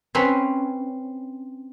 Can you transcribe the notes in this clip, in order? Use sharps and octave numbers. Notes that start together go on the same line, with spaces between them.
C4 C#4 B4